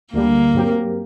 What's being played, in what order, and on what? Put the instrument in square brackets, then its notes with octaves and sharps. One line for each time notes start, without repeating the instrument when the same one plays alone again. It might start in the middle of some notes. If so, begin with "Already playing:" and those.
[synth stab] D2 D3 G3 [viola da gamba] A#3
[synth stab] G2 F#3 C4 G4 A#4